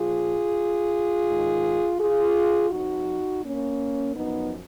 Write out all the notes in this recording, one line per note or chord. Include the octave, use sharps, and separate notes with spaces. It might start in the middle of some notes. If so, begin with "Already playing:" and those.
Already playing: A#2 F3 F4 G#4
G#2 D#3
F4 G#4
F2 F3 D#4 F#4
A#3 C#4
F#2 F3 B3 D#4